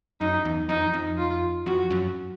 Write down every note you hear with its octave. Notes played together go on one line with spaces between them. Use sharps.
F#2 D#4
E2
F2 D#4
F2
F4
F2 F#4
F#2